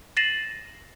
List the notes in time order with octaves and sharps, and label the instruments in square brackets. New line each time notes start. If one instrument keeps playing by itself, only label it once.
[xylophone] A6 A#6 C7 D#7 E7 F#7